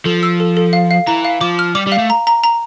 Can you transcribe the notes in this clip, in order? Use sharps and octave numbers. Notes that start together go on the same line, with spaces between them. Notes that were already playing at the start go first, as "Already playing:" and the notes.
F3 A4
E6
A4
A4
F5
F5
E3 A#5
F5
F3 D6
F6
G3 D6
G3
F5
A3
A#5
A#5
A#5